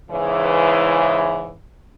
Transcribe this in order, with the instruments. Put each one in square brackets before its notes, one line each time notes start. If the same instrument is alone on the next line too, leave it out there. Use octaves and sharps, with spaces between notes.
[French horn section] E2 G#2 C#3 E3